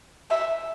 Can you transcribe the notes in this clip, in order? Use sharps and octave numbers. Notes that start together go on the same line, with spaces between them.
E5